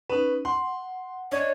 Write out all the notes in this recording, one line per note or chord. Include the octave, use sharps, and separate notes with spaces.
C#4 D#4 B4
F#5 C6
D4 C#5 D#5